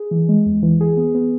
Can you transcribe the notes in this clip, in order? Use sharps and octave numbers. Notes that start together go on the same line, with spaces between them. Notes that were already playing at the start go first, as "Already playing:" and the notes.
Already playing: G#4
E3
G#3
E2
E3
G#4
B3
B3